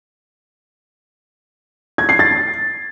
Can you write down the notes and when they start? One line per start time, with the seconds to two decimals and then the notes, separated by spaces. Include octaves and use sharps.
1.98 G#6
2.09 C7
2.19 A6